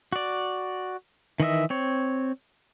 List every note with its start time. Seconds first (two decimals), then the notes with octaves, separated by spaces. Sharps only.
0.13 F#4 D5
1.40 D#3 E3 D#5 E5
1.70 C4 C#5